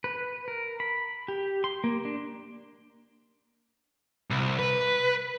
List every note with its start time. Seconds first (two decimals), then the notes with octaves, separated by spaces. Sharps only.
0.04 B4
0.48 A#4
0.80 B5
1.28 G4
1.64 C6
1.84 A#3
2.05 D4
4.31 C2
4.59 B4